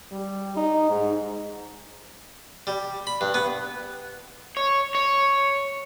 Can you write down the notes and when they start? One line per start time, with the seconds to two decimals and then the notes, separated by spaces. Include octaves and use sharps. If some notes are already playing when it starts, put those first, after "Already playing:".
0.12 G3
0.57 D#4
0.90 G#2
2.67 G3
3.07 B5
3.21 G2
3.34 B3
4.57 C#5
4.95 C#5